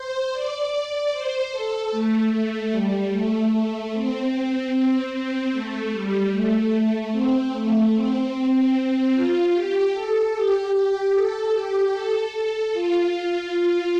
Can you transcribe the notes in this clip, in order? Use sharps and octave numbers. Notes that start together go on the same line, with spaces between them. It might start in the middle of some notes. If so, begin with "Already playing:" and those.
Already playing: C5
D5
C5
A4
A3
A3
G3
A3
A3
C4
C4
C4
A3
G3
A3
C4
A3
C4
F4
G4
A4
G4
G4
A4
G4
A4
A4
F4